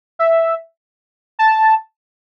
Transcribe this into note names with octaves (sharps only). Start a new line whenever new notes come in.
E5
A5